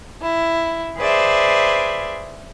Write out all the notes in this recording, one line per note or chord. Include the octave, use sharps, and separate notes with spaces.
E4
G#4 B4 C5 D5 E5